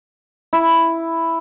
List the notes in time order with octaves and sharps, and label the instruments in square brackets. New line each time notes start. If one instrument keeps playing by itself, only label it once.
[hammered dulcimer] E4